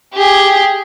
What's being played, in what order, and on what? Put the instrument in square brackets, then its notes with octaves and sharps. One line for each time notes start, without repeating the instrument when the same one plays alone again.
[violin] G4 G#4